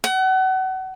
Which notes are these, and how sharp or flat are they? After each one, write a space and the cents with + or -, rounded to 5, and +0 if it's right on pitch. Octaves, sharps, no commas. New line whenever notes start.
F#5 +30